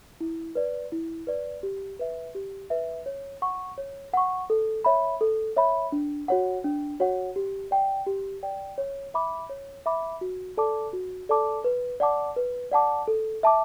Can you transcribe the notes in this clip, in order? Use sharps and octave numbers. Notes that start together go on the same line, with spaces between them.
E4
B4 D5
E4
B4 D5
G4
B4 E5
G4
B4 E5
C#5
F#5 C#6
C#5
F#5 C#6
A4
C#5 E5 B5
A4
C#5 E5 B5
D4
F#4 C#5 F#5
D4
F#4 C#5 F#5
G4
D5 G5
G4
D5 G5
C#5
E5 B5 D6
C#5
E5 B5 D6
F#4
A4 D5 A5 D6
F#4
A4 D5 A5 D6
B4
D5 F#5 A5 D6
B4
D5 F#5 A5 D6
A4
E5 A5 D6